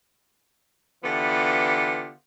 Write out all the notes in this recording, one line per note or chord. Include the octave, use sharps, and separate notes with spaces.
D3 E3 B3 F4 G4